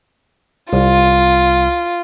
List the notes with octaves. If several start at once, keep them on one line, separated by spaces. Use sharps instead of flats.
C2 F4